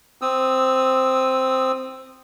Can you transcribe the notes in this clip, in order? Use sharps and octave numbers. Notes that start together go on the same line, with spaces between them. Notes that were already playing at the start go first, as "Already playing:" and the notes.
C4 D#6 E6